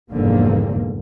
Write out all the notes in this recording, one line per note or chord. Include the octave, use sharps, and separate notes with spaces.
F1 E2 G#2 D3 G3 A#3